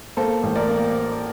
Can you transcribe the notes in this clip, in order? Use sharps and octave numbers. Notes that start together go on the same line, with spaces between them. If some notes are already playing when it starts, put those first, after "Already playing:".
A#3 A4 C5
A1
A#4 D5
A#3